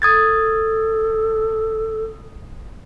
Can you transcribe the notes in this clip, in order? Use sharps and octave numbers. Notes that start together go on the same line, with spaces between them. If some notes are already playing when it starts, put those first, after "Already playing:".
A4 D#6 G#6 A6